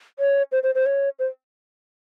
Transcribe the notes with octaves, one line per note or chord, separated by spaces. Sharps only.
C#5
C5
C5
C5
C#5
C5